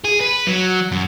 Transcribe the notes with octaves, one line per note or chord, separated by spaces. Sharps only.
G#4
B4
F#3
F#2